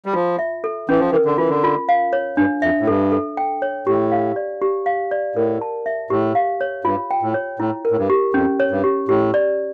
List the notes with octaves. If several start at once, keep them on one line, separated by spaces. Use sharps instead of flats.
G3
F3 F4
E5
A4
E3 C#4
F3
E3 A#4
D3
E3 F4
D3
F4
F5
C#5
G2 D4
F2 E5
A2
G2 A4
A4
G5
C#5
A2 G4
F5
D5
G4
F5
D5
A2 A#4
A5
E5
A2 G4
F5
C#5
G2 F4
G5
A2
C#5
A2 E4
A#4
A2
G2
G4
F2 C#4
C#5
G2
G4
A2 G4
D5